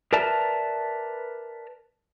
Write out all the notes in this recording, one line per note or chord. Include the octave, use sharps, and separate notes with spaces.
A#4 B4 D5 E5 A5 A#5